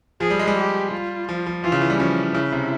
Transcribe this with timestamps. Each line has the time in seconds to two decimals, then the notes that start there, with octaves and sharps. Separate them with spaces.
0.20 F3 G#4
0.30 G3
0.39 G#3
0.48 G3
0.56 G4
0.92 F4
1.29 F3
1.46 F3
1.64 E3 F4
1.72 C#3
1.81 E3
1.90 G3
1.99 F3 C#4
2.35 C#3 E4
2.52 C3